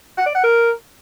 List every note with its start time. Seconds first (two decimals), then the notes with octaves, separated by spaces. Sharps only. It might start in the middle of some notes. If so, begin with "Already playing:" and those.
0.18 F#5
0.26 D5
0.35 F#5
0.44 A#4